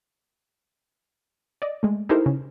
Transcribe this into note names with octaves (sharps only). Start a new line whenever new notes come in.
D5 D#5
G#3 A3
D#4 E4 G4 A4 A#4 C5
C#3